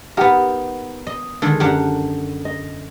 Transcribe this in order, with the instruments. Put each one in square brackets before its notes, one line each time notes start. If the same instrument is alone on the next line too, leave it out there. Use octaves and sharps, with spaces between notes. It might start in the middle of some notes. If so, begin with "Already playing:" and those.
[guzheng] B3 A#4 [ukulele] D#4 G4 F#5
[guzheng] D#5
[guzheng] D3 D#3 G#3 [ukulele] A4
[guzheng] F#2 D4 F#5 [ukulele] G4
[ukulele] D#5